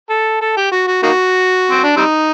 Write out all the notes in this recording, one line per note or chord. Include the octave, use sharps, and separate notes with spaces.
A4
A4
G4
F#4
F#4
A#3 D#4 F#4
C4
D4
G3 C4 D#4